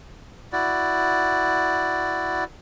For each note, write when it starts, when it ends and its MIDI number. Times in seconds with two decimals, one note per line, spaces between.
0.52 2.44 64
0.52 2.44 66
0.52 2.44 74